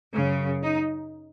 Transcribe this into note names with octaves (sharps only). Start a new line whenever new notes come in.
F#2 C#3 C#4
D#4